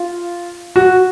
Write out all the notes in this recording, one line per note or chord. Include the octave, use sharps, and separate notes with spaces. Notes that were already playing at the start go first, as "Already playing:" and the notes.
Already playing: F4
F#4